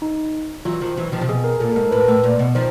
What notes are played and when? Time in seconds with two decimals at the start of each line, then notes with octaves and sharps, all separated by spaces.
0.02 D#4
0.65 E3 F#3 F4
0.81 D#3 F3
0.97 E3 F#3
1.12 D#3 F3
1.21 C3
1.29 B2 G#4
1.44 A#4
1.60 A#2 A4
1.70 A4
1.76 G#2 A#4
1.91 A2 B4
2.08 A2
2.23 A#2
2.39 B2
2.55 D#3 F3 C5